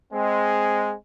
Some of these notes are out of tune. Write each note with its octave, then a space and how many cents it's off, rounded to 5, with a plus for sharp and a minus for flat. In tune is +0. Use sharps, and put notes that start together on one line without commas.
G#3 +0 C4 +0